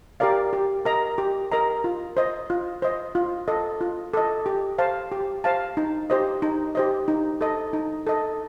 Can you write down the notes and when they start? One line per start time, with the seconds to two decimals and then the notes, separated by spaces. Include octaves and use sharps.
0.20 G4 A#4 D5 F5
0.53 G4
0.85 A#4 D#5 A#5
1.18 G4
1.52 A#4 D#5 A#5
1.84 F4
2.17 C5 D#5
2.50 F4
2.82 C5 D#5
3.15 F4
3.48 A4 D#5
3.81 F4
4.14 A4 D#5
4.46 G4
4.78 C5 F5 A5
5.12 G4
5.44 C5 F5 A5
5.77 D#4
6.10 G4 C5 D#5
6.42 D#4
6.75 G4 C5 D#5
7.08 D#4
7.41 A4 D#5
7.73 D#4
8.07 A4 D#5